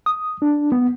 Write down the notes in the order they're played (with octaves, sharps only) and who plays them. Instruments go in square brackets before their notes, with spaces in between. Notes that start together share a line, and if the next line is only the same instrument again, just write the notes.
[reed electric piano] D#6
D4
B3